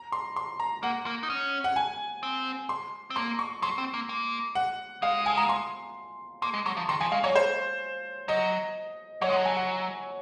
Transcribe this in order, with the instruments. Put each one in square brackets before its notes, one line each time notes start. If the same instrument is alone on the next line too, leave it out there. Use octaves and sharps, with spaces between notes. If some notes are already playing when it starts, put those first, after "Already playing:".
Already playing: [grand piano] A#5
C6
C6
A#5
[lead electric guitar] A#3 [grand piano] F#5
[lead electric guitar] A#3
D#4
C#4
[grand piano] F#5
G#5
[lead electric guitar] C4
[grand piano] C6
[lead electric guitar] C4
[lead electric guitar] A#3 [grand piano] C6
[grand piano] C#6
[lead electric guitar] F#3 [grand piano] C6
[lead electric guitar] C4
A#3
A#3
[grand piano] F#5
[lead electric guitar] G#3 [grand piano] F5
[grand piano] G#5
A#5
C6
[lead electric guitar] A#3 [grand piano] C6
[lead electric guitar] G#3
[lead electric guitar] F#3 [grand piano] C#6
[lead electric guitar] F3
[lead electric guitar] D#3 [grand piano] C6
[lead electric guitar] F3 [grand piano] G#5
[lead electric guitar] G#3 [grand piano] F5
[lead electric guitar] F#3 [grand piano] C#5
[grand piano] C5
[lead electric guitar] F#3 [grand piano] D#5
[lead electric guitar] F#3 [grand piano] C#5
[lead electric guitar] G#3
[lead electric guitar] F#3 [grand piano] F#5
[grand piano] G#5
F#5